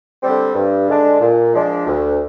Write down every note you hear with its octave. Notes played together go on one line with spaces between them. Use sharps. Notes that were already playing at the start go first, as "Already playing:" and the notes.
D3 G3 C4
G2
D3 G#3 D4
A#2
F3 G#3 D4
D2